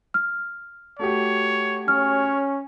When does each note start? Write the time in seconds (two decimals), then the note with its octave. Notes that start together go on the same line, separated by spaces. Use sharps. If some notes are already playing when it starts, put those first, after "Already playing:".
0.14 F6
0.99 A3 F#4 G4 C#5
1.88 C#4 C#5 F6